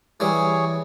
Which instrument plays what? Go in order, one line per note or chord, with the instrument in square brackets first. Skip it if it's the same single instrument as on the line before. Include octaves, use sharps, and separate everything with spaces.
[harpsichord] E3 G3 [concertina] G#4 C#5